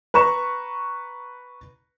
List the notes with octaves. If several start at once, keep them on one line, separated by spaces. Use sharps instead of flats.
B4 A#5 C#6 E7